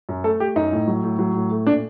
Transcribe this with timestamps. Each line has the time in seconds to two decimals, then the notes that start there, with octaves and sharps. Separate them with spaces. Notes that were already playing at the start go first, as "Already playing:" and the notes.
0.09 F#2
0.24 A3 A4
0.40 A3 G4
0.56 F#2 D#4
0.72 A2
0.88 F#3
1.04 A2
1.19 F#3
1.34 A2
1.51 A3
1.66 A#2 D4